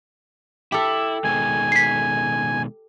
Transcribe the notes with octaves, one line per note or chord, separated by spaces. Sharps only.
E4 G4 A4
B2 D#3 G#3 G#5
B6 C7